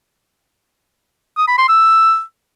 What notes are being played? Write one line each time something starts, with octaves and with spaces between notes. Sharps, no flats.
D#6
B5
C6
E6